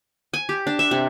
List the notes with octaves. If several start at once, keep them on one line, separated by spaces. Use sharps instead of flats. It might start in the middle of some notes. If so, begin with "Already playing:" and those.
G#5
G4
D4
E5
C3